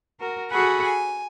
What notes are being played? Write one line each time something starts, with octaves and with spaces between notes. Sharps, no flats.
F#4 A#4
F#4 G#4 A4 F#5 G#5 B5
G#5